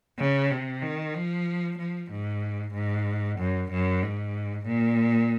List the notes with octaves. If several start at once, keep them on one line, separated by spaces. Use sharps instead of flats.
C#3
C3
D#3
F3
F3
G#2
G#2
F#2
F#2
G#2
A#2